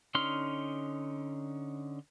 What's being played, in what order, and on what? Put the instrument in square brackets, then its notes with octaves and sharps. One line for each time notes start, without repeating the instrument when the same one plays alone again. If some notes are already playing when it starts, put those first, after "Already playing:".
[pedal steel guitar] D3 C#4 D#4 C6 F6